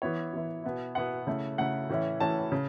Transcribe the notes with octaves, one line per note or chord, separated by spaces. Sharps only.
E3 B3 E4 C#5
E3 B3 E4
B2 B3 E4
B2 B3 E4 F#5
C#3 A3 E4
C#3 A3 E4 F#5
A2 E3 C#4 E4
A2 E3 C#4 E4 A5
C#3